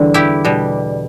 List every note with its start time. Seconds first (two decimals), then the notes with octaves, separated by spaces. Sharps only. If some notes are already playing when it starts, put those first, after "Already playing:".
Already playing: E2 D3 G3
0.14 E4 G4
0.45 B2 G3